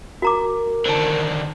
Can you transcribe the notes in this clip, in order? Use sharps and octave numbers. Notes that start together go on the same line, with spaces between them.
F#4 A#4 A#5 D6
D3 D#3 C5 A5